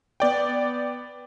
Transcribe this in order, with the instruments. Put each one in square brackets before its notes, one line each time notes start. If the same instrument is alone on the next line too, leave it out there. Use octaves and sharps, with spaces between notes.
[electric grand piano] B3 D5 G5